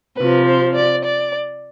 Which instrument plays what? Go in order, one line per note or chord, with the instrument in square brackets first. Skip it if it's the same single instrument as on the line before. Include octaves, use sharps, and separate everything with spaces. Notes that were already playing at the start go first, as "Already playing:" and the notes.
[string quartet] C3 F3 B4
C5
D5
D5